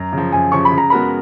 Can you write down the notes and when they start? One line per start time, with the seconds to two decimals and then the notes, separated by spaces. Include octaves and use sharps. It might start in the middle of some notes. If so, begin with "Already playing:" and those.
Already playing: F#2 A#5
0.13 C#3 F3
0.32 F#2 G#5
0.52 C#3 F3 C#6
0.65 B5
0.72 C#3
0.78 A#5
0.90 G#3 B3 F#4 A#4 B5